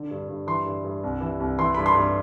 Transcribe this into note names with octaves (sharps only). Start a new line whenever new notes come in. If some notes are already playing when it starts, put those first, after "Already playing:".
Already playing: D3
G2
G2
E3 C6
G2
G2
C2
E3
C2
E3 C6
G2 B5
C6
G2